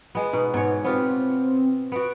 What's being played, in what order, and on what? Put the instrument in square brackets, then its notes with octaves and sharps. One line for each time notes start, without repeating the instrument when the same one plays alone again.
[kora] G#3 B3
[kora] B2 [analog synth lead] D#4
[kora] G#2 C#5 [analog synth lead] B3
[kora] B3 F4 G4 [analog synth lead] C4
[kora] B3 F#4 [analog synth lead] D7